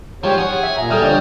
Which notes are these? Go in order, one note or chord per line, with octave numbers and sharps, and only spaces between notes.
G#2 F3 G3 G4 C#5
G#4 F#5
E5
A#2 A#5
D2 G3 A4 D#6 F6
D3 F3 D4 C#5 D#5